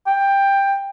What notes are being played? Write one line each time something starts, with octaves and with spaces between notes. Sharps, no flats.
G5